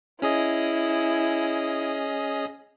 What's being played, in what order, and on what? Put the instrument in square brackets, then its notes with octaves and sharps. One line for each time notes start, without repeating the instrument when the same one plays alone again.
[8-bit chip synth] C#4 G#4 D#5 [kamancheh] E4